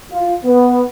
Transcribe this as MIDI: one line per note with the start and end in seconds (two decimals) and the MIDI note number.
0.12 0.34 65
0.45 0.83 59